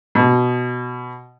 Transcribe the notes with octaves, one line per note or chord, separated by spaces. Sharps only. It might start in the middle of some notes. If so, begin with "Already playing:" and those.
B2